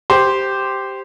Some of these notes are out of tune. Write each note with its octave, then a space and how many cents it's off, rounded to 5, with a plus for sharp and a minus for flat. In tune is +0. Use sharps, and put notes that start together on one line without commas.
G4 +0 C5 +0